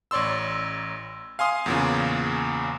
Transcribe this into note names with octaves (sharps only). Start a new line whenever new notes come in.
A1 C#5 D5 C6 E6
F5 G#5 C6 D#6
E2 A#2 C#3